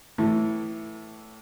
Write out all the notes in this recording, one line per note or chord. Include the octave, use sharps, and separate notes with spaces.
A2 E3 A3